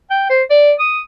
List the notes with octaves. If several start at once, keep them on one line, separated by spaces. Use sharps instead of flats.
G5
C5
D5
D#6